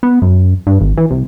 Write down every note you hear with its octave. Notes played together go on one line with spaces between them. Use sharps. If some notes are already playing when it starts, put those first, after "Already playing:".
B3
F#2
G2
G#1
E3
C2